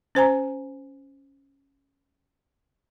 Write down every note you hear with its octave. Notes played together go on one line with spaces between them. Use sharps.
C#4 C5 G#5 A#5